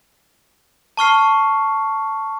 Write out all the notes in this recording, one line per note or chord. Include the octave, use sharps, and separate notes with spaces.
A5 C#6 F6 C7